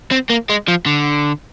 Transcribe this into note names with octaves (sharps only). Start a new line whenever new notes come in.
C4
A#3
G#3
F3
D3